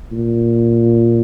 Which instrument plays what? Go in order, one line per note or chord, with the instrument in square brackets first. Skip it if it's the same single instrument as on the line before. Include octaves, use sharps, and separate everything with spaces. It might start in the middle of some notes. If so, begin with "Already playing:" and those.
[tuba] A#2